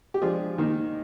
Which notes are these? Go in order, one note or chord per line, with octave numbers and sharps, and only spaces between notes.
G4
F3 G#3 D4 F4 G#4
D#3 A#3 D#4